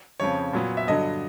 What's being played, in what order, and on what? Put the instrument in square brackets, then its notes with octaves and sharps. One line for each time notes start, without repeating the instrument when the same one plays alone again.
[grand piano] F2 C#3 F3 C#5
A#2 F#3 B3
E5
G2 D3 F#3 D#5